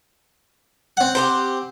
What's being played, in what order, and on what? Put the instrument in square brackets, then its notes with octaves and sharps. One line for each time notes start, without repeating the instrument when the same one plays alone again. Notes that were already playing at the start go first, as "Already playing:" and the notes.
[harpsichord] C4 F#5
[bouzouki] G4 A4 C5